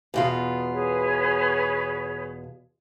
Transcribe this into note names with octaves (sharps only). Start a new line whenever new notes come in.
E2 B2 F4
G#4 B4 C#5